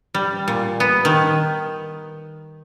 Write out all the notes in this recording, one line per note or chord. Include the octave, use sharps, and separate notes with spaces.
G3
A#2
B3
D#3